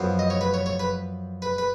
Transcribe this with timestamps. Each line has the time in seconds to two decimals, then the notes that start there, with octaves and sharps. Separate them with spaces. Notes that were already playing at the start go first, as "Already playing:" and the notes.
Already playing: F#2 F3 B3
0.19 D#5
0.30 C#5
0.41 B4
0.54 C#5
0.66 C#5
0.80 B4
1.42 B4
1.58 B4